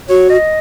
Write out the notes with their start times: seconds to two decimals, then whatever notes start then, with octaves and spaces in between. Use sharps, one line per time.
0.09 F#4 C#5
0.29 D#5